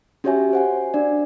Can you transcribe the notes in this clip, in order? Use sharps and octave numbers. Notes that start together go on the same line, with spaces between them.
C#4 F#4 G4 C#5 E5 G#5
C5 F#5 G#5
D4 D5